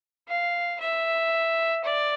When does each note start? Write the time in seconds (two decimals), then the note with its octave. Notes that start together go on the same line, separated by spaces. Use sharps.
0.29 F5
0.80 E5
1.85 D5